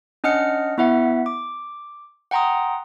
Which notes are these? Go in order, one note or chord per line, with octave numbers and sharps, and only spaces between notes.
C#4 D4 D#5 F#5 F6 C#7
B3 E4 E5 F#5
D6
F#5 G5 A#5 C6 D#6